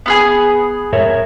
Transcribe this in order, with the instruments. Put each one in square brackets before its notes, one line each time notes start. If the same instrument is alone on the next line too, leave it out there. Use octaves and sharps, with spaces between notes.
[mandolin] B3 F4 G#4
[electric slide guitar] A#4 C#5 E5